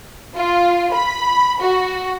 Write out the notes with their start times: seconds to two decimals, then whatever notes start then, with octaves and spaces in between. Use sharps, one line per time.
0.36 F4
0.93 B5
1.61 F#4